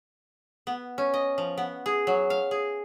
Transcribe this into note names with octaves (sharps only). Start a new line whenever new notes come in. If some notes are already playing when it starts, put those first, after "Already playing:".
B3
C#4
D#5
F3
B3
G#4
F#3
F5
G#4